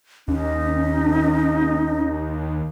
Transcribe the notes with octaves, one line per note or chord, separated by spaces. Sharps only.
D#2 C#4 D#4